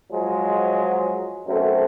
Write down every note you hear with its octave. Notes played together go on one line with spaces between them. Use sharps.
F3 F#3 G#3
B1 F#2 A3 C4 A4